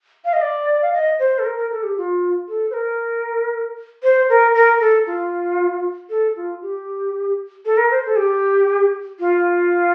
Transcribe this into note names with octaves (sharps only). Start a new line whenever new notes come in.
F5
D#5
D5
F5
D#5
C5
A4
A#4
A#4
A4
G4
F4
A4
C5
A#4
C5
A#4
A#4
A4
F4
A4
F4
G4
A4
A#4
C5
A4
G4
F4